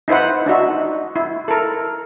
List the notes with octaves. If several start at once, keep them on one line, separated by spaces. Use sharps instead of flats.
D#4 E4 B4 C5 F#5
D4 D#4 F#4 E5
E4
A4 A#4